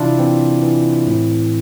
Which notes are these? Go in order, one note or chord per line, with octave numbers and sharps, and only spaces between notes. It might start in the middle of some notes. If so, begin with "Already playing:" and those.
Already playing: C3 E3 D4 E4 F4
E3 C4
E3
A2